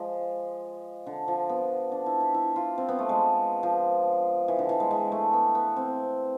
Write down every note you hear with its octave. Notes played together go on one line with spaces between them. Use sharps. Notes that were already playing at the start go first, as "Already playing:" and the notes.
Already playing: F3 G#3
D3
F3
B3
D4
E4
E4
E4
F4
C4
B3
A3
G#3
F3
E3
D3
E3
G#3
G#3
A3
B3
B3
C4